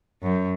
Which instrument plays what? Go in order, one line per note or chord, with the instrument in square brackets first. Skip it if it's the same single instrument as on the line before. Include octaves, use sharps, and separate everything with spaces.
[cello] F#2